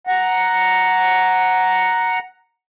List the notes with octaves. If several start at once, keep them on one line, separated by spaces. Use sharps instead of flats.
F#5 A#5